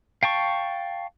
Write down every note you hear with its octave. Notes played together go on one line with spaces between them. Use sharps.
F5 G5 A5 C#6